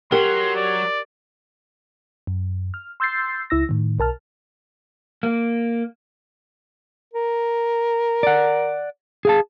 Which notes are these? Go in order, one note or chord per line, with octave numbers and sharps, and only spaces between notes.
F#3 G4 A#4 C6
D5
F#2
F6
C6 E6 G6 A6 C7
C#2 E4 E6 A#6
A2 D#3
B1 A#4 A5 F6
A#3
A#4
D5 F#5
G#4 F5 A5